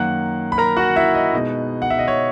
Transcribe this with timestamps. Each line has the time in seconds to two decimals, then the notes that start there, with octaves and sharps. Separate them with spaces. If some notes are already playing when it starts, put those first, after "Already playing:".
Already playing: F#2 D#3 A#3 F#5 F#6
0.52 B5
0.58 A#4 A#5
0.77 F#4 F#5
0.96 E4 E5
1.14 D#5
1.33 B2 G#3 B3 D#4
1.82 F#5
1.90 E5
1.99 D#5
2.08 C#5